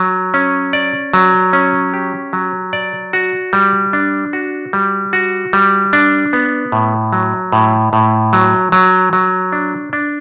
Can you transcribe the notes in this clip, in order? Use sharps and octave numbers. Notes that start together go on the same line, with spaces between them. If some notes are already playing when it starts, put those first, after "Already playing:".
Already playing: F#3
C#4
D5
F#3
C#4
G4
F#3
D5
F#4
G3
D4
F#4
G3
F#4
G3
D4
B3
A2
F#3
A2
A2
F#3
F#3
F#3
D4
D4